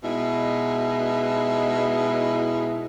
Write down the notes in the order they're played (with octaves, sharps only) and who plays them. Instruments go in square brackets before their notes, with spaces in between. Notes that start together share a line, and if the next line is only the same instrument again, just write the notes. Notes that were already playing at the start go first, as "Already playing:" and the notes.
[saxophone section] B2 G#3 D#4 E4